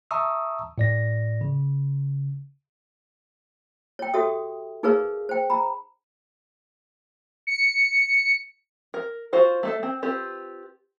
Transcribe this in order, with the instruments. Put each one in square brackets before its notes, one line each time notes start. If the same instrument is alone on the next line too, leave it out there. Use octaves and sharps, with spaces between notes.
[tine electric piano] E5 A5 A#5 C#6 D#6 E6
A2 D5 A#6
C#3
[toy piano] C#5 G5
F#4 G4 A4 C#5 E5 D#6
D#4 G#4 A#4 B4 C#5 F5
C5 G5
A#5 B5
[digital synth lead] C#7
[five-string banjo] A#4
F4 F#4 C5 F5
A3 A4 E5
C4
C4 F4 G4 B4